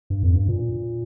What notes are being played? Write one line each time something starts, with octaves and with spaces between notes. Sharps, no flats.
G2
F2
G2
A#2